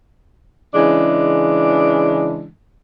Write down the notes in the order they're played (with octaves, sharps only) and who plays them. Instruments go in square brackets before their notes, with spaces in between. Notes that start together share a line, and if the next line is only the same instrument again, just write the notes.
[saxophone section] C#3 E3 G#3 D4